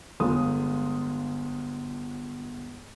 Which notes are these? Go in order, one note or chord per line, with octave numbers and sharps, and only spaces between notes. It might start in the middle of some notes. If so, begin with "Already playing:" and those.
G1 G#3 F4 D#6